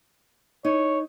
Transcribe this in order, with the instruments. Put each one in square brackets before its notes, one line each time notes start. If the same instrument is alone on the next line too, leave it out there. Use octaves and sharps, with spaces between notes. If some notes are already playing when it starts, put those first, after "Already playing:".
[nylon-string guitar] D#4 [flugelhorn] C#5